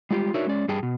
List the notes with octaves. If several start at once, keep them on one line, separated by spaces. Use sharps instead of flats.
G3 G#3 F4 G4
D4 D#4 F#4 A#4 C#5 E5
G#3 C#4 D5
G2 G3 G#4 G5 A5
B2